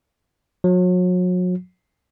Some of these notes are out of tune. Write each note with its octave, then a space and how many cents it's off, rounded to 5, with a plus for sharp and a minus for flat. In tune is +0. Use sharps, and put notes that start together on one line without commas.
F#3 -35